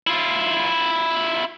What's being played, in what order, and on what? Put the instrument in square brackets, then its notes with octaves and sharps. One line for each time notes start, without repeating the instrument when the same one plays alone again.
[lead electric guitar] E4 F4